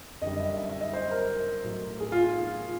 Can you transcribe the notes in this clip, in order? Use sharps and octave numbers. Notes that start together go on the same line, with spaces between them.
F#2 D3 G3 D#5
E5
E5
E5
D#5
C5
A#4
A2 F#3
G#4
F4
F4